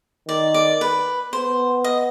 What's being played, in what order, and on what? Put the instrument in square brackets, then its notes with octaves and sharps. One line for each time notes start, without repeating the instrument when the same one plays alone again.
[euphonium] D#3 [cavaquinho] D5
[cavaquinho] D5
B4
[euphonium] B3 [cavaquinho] C5
[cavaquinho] D#5